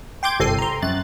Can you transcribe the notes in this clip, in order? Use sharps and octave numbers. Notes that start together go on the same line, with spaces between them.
G5 C6 D6 G6 G#6
G1 C2 C4 A4 C7 D#7
A#5 C6
F#2 F#6 A6